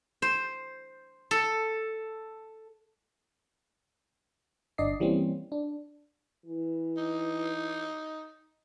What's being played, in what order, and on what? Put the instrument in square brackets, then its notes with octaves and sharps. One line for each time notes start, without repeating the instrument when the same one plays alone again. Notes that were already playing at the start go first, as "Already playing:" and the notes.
[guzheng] C5
A4
[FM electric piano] G1 D4 D5 D#5 C7
E3 G3 A#3 C4 C#4
D4
[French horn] E3
[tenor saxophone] D#4